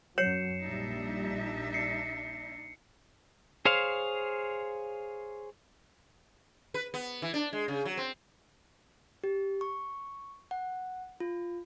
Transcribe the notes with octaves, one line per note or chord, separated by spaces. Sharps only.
F#2 F#3 C#5 C7 C#7 E7
A#1 A#2 G3 D4 D#4 E5
C7 C#7
G#4 C5 C#5 F5
B4
B3
E3
D4
G#3
C#3
F#3
C4
G4
C#6
F#5
F4